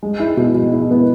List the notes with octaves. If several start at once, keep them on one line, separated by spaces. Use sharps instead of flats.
G#3
E4
B2
G#3
E4
B3